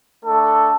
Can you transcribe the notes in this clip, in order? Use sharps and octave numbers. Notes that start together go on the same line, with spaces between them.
A3 D4 A4